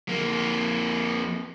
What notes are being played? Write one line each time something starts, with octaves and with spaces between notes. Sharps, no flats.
F2 A#3